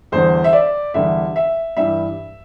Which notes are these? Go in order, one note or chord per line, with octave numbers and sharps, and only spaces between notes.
E2 D3 G3 C5
E5
D5
E2 D3 G3 E5
E5
G2 E3 G3 E5